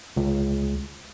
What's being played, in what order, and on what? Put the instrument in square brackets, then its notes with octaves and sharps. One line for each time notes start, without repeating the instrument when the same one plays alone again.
[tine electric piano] C#2